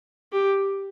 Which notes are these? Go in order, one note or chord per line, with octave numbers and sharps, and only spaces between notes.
G4